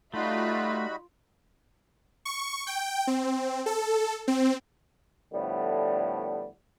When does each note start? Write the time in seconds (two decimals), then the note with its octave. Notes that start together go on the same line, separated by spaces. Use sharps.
0.14 G3 A3 D#4 F4 F#4 B5
2.25 C#6
2.67 G5
3.07 C4
3.66 A4
4.28 C4
5.34 A2 D3 F3 G3 A3 B3